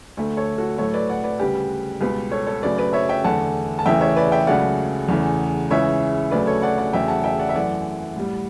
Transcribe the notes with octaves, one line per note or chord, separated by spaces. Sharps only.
D2 D3 A3
A4 C#5
F#4 A4
A2 F#3 A3 A4 C#5
B4 D5
D5 F#5
B4 D5
D2 C#3 G3 G4 B4
C#2 B2 G3 G4 B4
A4 C#5
A4 C#5
F#2 C#3 F#3 A3 B4 D5
B4 D5
C#5 E5
E5 G5
E2 D3 A3 F#5 A5
A5
E2 C#3 E3 A3 E5 G5
C#5 E5
B4 D5
E5 G5
C#2 C#3 F#3 A3 D5 F#5
E2 C#3 E3 A3
C#2 C#3 E3 C#5 E5
D2 C#3 F#3 A3 B4 D5
A4 C#5
D5 F#5
D5 F#5
E2 C#3 F#3 A3 E5 G5
F#5 A5
E5 G5
D5 F#5
E5
F#2 E3 A3 D5 F#5
A2 G3